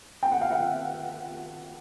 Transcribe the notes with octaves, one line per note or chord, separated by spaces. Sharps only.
G5
F#5
F5
E5 F#5